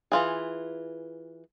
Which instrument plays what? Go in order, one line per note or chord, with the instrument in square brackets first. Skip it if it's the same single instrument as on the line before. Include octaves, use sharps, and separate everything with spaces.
[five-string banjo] E3 F4 G#4